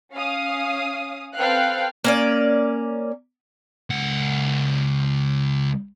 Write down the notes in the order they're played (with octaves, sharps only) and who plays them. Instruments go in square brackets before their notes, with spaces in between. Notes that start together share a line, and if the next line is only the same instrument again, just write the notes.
[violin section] C#4 F5 D#6
C4 A4 B4 F5 G5 F#6
[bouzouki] A#3 C#4 D5
[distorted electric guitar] C#2 F#5